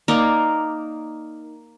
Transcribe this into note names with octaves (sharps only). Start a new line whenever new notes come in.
A#3 D#4 A#4 D5